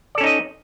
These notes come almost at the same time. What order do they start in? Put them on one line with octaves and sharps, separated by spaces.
D5 A4 C#4 D#4 D#5